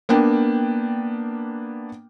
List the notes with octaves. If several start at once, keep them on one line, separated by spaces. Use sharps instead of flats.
A#3 B3 D4 G5